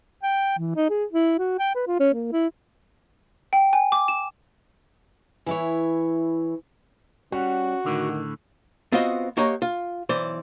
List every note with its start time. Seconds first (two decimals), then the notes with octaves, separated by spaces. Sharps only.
0.23 G5
0.59 E3
0.76 D#4
0.90 G#4
1.13 E4
1.39 F#4
1.59 G5
1.75 B4
1.87 F4
2.00 C#4
2.14 A#3
2.32 E4
3.53 G5
3.73 G#5
3.92 D6
4.08 E7
5.46 E3 E4 C#5
7.32 G3 C#4 F#4 F#5
7.85 A2 D3 D#3
8.92 B3 C4 F4 F#4 C5 D#5
9.37 A#3 F#4 G4 C#5 D#5 A#5
9.62 F4
10.09 B1 E3 C5 D5